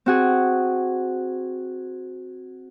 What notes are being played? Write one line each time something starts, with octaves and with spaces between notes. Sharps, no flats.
C4 F#4 G#4